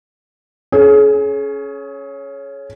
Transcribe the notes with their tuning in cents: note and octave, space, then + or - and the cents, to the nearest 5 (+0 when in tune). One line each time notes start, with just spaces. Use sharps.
C#4 +0 G#4 +35